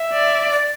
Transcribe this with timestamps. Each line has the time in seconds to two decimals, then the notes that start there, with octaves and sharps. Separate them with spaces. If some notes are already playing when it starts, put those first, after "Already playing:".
Already playing: E5
0.13 D5
0.51 D5